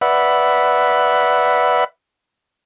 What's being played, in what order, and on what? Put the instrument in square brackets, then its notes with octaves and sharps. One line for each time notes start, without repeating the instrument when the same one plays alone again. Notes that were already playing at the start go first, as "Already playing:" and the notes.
[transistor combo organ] B4 D5 E5 F#5 B5